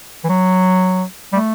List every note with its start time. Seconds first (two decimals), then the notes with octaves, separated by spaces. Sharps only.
0.24 E3
0.29 F#3
1.33 G3
1.36 A3